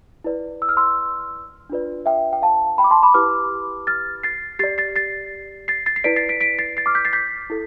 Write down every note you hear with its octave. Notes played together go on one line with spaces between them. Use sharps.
E4 B4 D5
E6
F6
C6 E6
D4 F4 B4 D5
E5 G5
G5
F5 A5
G5 B5
D6
A5 C6
B5 D6
E4 G4 B4 D6 F6
F6 A6
A6 C7
G4 D5 A6 C7
A6 C7
A6 C7
A6 C7
A6 C7
C7
E4 B4 D5 B6 D7
A6 C7
B6 D7
B6 D7
A6 C7
A6 C7
D6 F6
G6 B6
A6 C7
G6 B6
E4 A4